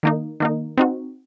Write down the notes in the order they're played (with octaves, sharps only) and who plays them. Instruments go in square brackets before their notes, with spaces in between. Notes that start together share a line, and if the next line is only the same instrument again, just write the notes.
[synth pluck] D#3 A#3 D#4
D#3 A#3 D#4
C4 D#4 F#4